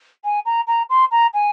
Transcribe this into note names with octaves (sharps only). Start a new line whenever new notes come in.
G#5
A#5
A#5
C6
A#5
G#5